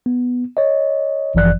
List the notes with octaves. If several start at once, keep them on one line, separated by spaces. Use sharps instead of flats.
B3
C#5 D#5
G1 F#2 E3 F3 D5 F#6